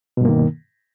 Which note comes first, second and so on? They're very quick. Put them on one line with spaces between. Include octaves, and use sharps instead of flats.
B2 G2 A#3 D#3